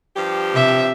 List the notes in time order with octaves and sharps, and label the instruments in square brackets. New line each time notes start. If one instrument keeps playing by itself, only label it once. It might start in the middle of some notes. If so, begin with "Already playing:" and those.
[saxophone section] G2 F3 G4
[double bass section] C3 [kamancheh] E5